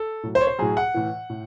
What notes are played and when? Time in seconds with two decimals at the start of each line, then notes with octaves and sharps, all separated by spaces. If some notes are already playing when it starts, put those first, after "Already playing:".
Already playing: A4
0.23 A2 F#3
0.35 C5
0.41 C#5
0.47 C5
0.58 A2 F#3 G#4
0.77 F#5
0.94 A2 E3
1.30 A2